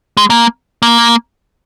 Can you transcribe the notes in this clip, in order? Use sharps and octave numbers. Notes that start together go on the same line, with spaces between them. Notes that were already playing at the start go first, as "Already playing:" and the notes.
G#3
A#3
A#3